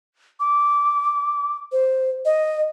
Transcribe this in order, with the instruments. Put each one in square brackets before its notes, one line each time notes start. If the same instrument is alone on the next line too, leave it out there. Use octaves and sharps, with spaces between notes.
[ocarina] D6
C5
D#5